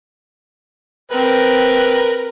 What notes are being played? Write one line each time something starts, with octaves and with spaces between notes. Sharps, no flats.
C4 A#4 B4